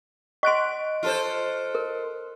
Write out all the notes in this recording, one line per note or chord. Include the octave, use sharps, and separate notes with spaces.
D#5 C6 C#6 F#6 D7
F4 A4 C5
A#4